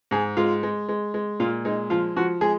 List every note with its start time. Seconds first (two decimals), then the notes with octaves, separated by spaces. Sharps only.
0.11 G#2 G#4
0.37 G#3 F4
0.63 G#3
0.89 G#3
1.14 G#3
1.40 A#2 F4
1.65 G#3 D#4
1.90 F3 F4
2.16 F3 F#4
2.41 G#3 G#4